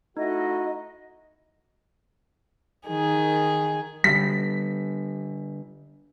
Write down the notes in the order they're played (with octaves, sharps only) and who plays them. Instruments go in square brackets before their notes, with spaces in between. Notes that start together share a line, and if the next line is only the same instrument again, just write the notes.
[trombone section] A3 E4 F#4 [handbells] D#4 [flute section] D#5
[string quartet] D#3 G#4
[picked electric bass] D3 G3 [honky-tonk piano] B6